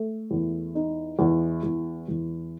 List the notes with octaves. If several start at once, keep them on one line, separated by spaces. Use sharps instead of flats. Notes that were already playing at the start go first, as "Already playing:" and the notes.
Already playing: A3
E2
D#4
E2
E2
E2